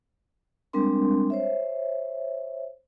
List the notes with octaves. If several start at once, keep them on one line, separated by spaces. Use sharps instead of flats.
G3 G#3 C4 D4 A#4 C6
C5 C#5 E5